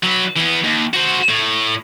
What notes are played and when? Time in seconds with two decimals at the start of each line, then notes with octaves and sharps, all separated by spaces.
0.03 F#3 B4
0.36 E3 B3
0.64 D#2
0.94 F#4 C5
1.29 A2